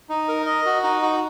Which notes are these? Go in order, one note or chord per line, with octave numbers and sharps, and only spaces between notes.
D#4
A#4
D#5
F#4
D#4
F#4